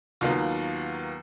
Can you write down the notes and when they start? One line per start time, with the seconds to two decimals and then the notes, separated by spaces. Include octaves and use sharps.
0.21 D#2 D#3 F#3 B3 F4